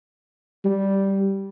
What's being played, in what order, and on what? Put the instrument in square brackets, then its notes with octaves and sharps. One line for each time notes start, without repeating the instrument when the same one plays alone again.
[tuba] G3